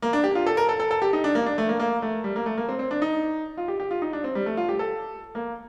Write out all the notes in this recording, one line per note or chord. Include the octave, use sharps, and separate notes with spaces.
A#3
D4
G4
F4
A4
A#4
A4
A4
A4
G4
D#4
D4
A#3
D4
A3
A#3
A#3
A3
G3
A#3
A3
A#3
C4
C4
D4
D#4
F4
G4
G4
F4
D#4
D4
C4
G3
A3
F4
G4
A4
A#3